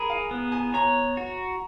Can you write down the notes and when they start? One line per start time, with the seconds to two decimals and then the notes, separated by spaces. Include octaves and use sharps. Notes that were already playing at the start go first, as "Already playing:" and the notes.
Already playing: G#4 A#4 A#5 B5
0.10 F5
0.31 B3
0.52 G#5
0.74 C#5 A#5
1.17 F#4